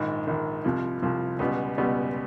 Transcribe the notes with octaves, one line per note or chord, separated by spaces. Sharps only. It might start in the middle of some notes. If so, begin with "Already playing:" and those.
Already playing: A#1 G#2 D#3
A#1 G#2 D#3
C2 C3 F3
C2 C3 F3
C#2 B2 G3 B3
C#2 B2 G3 B3